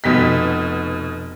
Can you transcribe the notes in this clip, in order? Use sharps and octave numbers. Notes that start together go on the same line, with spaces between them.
F1 B2 B6